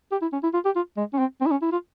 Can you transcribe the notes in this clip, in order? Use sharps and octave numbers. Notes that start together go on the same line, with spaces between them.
G4
E4
C#4
E4
F4
G4
F4
G#3
C#4
C4
C4
E4
C#4
E4
F4